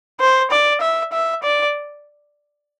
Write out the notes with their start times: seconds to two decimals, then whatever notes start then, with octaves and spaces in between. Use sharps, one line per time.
0.20 C5
0.51 D5
0.82 E5
1.12 E5
1.43 D5